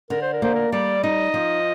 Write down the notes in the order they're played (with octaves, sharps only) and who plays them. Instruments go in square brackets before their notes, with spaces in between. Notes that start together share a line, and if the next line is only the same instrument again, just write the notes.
[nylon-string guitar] D3 [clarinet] A#4
[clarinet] C5
A#4
[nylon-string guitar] A#3 [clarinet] C5
[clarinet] A#4
[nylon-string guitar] G3 [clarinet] D5
[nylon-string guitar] D#4 [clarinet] D#5
[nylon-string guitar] F3